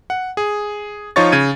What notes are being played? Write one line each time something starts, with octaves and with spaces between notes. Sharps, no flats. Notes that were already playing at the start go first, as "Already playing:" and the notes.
F#5
G#4
F3 D#4 F4 C#5 C#6 A6
C#3 G#6 D#7